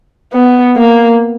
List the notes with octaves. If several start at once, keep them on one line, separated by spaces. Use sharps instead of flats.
B3
A#3